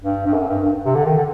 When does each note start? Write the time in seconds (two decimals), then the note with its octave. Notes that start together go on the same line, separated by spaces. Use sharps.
0.02 G2
0.26 G2
0.34 F#2
0.49 G2
0.65 G2
0.85 C3
0.95 D3
1.06 D#3
1.16 D3